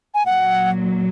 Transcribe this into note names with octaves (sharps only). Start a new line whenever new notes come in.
G#5
A#2 F#3 F#5